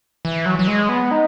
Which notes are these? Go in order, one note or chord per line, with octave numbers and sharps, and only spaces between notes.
E3
F#3
F#3
G#3
B3
D#4